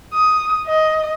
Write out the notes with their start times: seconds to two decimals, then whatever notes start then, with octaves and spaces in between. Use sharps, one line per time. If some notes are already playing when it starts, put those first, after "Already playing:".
0.13 D#6
0.67 D#5